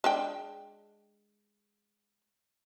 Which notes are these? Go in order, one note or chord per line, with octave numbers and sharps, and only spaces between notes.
G#3 D4 G5